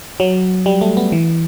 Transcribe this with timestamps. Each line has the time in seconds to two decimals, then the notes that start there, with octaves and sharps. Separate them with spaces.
0.20 F#3
0.66 G3
0.81 A3
0.97 B3
1.12 E3